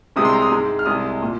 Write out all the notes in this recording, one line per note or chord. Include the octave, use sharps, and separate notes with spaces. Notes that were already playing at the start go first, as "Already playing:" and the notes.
C2 C3 G#3 D#6
C6
A#5
D#6
G#2 G#3
F6
C2 C3 G#3 D#6
A#2